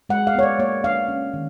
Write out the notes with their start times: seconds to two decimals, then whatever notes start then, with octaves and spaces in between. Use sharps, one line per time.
0.09 G#3 F#5
0.27 F5
0.35 B3 C#5
0.43 D5
0.59 A#3 C#5
0.84 D4 F5
1.08 C#4
1.34 D#3